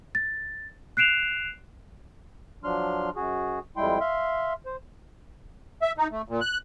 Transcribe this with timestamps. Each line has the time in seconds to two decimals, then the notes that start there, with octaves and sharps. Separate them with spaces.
0.15 A6
0.97 F#6 C7 D7 E7 F7
2.64 F3 F#3 D4 C6 F6
3.16 F#2 F#4 G#4
3.77 F2 G3 G#3 E4 G5 C6
4.00 E5 F5 C6
4.66 C5
5.82 E5
5.98 D#4
6.11 A3
6.29 A#2
6.41 F#6